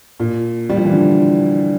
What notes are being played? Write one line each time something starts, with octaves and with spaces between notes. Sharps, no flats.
A#2
G3
F3
E3
D3